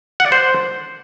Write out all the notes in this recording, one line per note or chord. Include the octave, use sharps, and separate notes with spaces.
F#5
D5
C5